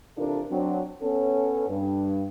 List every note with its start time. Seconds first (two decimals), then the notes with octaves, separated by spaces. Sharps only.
0.17 C3 E3 D4 F4 A4 A#4
0.50 F#3 C4 D4
1.02 B3 C#4 A4
1.68 G2